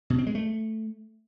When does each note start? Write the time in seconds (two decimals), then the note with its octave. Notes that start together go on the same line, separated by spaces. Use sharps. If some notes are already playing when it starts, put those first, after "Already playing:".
0.10 B2
0.18 C4
0.27 G#3
0.35 A3